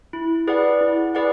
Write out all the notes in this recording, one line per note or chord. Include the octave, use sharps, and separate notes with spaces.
E4
G#4 B4 D5 F#5
E4
G#4 B4 D5 F#5